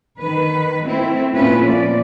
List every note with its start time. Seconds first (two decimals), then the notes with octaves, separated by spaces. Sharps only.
0.19 D#3 B4
0.87 A3 C4 E4
1.36 A#2 A3 C#4 E4 F4 B4
1.67 F3 D5